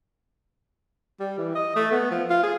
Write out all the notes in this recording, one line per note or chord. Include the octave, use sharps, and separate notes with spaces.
G3
E3
D#5
A3
B3
F3
F4
G#4